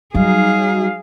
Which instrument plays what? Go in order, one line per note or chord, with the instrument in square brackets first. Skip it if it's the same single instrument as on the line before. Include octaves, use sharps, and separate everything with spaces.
[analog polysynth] F#3 D#4 [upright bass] G3 [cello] G#4 [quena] F5